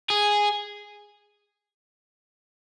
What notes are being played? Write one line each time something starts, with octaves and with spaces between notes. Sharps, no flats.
G#4